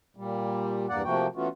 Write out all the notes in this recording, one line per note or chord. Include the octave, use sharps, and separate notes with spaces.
A#2 G3
E2 G2 A#3 D5 F#5
C3 F3 A3 A#3 F#4 G5
E3 A3 B3 C#4 F4 F#4